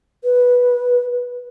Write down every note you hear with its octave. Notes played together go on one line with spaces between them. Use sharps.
B4